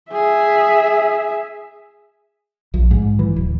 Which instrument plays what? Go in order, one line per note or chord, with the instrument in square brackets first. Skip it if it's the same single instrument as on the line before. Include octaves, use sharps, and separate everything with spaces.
[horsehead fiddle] G#4 E5
[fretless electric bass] A#1
G#2
E3
D1